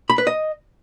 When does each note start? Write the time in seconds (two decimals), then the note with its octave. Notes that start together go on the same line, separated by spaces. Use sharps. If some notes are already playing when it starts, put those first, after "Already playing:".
0.10 B5
0.18 B4
0.27 D#5